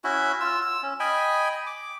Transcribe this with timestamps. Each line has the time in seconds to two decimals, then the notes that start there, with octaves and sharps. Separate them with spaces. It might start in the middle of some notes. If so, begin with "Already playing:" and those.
0.04 C#4 E4 F#4 E5
0.40 F4 E6
0.62 E6
0.83 C#4
1.00 D#5 G5 G#5 B5
1.67 D6